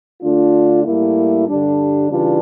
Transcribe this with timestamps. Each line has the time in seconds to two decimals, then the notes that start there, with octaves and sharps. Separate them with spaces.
0.22 D3 A3 D4 F4
0.84 A2 G3 A#3 E4
1.47 G2 D3 G3 D4
2.09 C#3 E3 G3 D4 F4